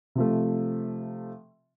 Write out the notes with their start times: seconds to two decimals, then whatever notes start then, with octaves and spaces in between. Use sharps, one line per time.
0.15 C3 F3 A3